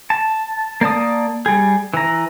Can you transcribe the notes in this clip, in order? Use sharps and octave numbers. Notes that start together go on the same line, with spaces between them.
A5
A#3 D5 A5 D#6
G3 G#4
E3 A#5